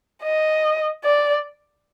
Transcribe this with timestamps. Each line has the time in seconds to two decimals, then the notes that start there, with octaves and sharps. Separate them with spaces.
0.22 D#5
1.04 D5